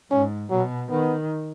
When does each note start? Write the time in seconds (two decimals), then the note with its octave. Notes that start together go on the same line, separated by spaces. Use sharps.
0.11 G#2 C#4
0.50 B2 F#3
0.90 D#3 B3